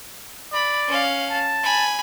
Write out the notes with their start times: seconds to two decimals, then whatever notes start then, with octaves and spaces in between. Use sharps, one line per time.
0.53 D5 B5
0.88 C#4 F5
1.30 A5
1.63 G#5 B5